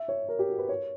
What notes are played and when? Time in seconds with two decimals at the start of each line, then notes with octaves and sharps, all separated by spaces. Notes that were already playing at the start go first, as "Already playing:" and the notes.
Already playing: E5
0.08 C#5
0.28 A#4
0.39 G4
0.49 F#4
0.58 B4
0.69 C#5